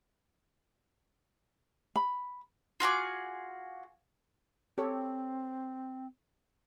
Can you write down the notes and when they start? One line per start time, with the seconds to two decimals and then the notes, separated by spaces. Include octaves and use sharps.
1.96 B5
2.80 F4 F#4 G#4 D6
4.78 C4 G4 A4 C#5